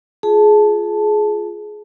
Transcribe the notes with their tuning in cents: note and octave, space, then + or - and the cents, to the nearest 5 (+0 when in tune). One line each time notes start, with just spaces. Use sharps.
F4 +0 G#4 +20 A5 +0